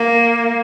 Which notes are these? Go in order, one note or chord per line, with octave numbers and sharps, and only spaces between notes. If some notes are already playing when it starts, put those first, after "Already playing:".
Already playing: A#3